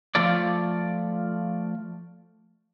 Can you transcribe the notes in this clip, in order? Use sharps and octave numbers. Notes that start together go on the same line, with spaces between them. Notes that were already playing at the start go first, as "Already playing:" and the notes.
F3 A3 F4 A4 D5